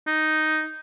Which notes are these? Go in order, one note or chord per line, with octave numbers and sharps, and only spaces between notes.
D#4